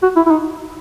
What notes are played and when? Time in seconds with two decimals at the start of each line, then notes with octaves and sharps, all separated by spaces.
0.03 F#4
0.16 E4
0.26 E4
0.31 D#4